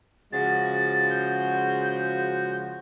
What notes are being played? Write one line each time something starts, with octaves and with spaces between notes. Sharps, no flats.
C#3 F3 G#3 F#4 A6
G6